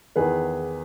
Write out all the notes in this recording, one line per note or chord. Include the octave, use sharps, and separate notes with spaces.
E2 D#3 G#4 B4